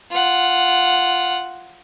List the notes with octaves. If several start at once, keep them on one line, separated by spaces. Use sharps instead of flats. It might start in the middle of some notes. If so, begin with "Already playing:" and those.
F4 F#5